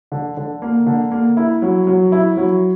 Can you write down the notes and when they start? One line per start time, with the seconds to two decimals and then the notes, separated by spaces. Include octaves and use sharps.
0.12 D3
0.37 D3
0.62 A#3
0.86 D3
1.11 A#3
1.37 E4
1.62 F#3
1.87 F#3
2.12 E4
2.37 F#3